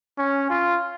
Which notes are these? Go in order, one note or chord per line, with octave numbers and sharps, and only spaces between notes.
C#4
F4